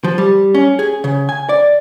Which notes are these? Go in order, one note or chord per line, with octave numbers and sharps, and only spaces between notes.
F3
G3
C#4
G#4
C#3
G#5
D5